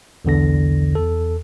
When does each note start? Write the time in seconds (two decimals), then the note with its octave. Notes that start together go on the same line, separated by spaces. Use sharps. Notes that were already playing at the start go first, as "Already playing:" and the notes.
0.25 B1 E2 D3 A#6
0.95 E2 A4